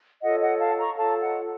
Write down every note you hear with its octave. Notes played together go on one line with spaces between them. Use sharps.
F4 A4 C#5 D#5 F#5
D#5 F#5
F5 A5
A#5 C#6
F4 A4 C#5 F5 A5
D#5 F#5